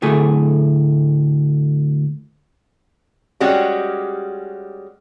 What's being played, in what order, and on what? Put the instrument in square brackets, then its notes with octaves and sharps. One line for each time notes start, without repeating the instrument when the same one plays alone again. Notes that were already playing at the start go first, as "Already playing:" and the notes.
[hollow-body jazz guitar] D2 A2 A3 G#4
[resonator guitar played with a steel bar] G3 G#3 C#4 F#4 G4